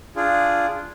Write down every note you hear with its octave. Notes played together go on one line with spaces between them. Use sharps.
D4 F4 G#4